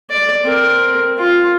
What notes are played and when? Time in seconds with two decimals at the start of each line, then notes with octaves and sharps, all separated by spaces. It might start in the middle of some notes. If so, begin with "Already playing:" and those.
0.11 D5
0.44 C4 A#4
1.18 F4